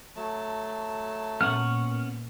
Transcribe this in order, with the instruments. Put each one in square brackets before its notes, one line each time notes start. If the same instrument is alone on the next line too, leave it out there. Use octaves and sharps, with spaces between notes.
[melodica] F#3 A3 A5
[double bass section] A#2 [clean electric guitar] B3 C#4 F#5 [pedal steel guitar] C#6 F6